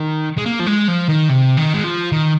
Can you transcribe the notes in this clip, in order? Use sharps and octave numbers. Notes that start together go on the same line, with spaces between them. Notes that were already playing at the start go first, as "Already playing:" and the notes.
Already playing: D#3
G#3
A#3
F3
G#3
F3
D#3
C3
D#3
G#3
F3
D#3